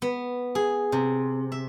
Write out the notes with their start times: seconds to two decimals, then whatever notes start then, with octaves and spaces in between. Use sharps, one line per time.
0.02 B3
0.55 G#4
0.92 C3
1.52 E5